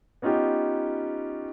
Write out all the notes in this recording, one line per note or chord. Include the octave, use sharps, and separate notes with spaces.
B3 C#4 D#4 F4 G4